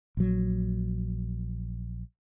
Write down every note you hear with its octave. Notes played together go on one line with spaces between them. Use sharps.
A#1 F#3